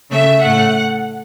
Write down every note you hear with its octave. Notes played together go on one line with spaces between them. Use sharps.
C#3 A3 E5
A2 A3 F#5